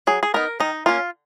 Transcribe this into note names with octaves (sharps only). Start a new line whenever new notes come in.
F#3 G#4
G#4
B3 D#4 A#4
D#3 D#4
A#3 C#4 F4